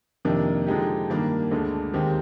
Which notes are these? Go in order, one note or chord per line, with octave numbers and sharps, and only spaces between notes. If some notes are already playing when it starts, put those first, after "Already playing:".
F2 C3 D#3 A#3 D4
D3 F3 G#3 D#4 G4
G2 D#3 A#3 D4
D2 D3 G#3
D#2 D#3 G#3 C4 G4